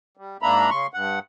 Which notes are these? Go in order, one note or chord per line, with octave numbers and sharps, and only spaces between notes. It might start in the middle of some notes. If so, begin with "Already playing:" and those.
G3
G#2 A#3 D4 E5 A#5 B5
C#3 C6 C#6
G2 F#5